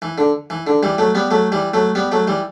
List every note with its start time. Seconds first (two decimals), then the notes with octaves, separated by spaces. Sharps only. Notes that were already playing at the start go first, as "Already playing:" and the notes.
0.02 E3
0.18 D3
0.50 E3
0.67 D3
0.83 E3 G3
0.98 F#3 A3
1.15 G3 B3
1.31 F#3 A3
1.52 E3 G3
1.74 F#3 A3
1.95 G3 B3
2.11 F#3 A3
2.27 E3 G3